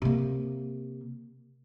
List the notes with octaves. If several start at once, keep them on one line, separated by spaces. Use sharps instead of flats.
C3 A#3